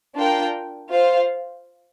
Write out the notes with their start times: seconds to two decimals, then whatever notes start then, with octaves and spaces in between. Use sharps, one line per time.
0.15 D4 F4 A#4 G5
0.90 F4 C5 F5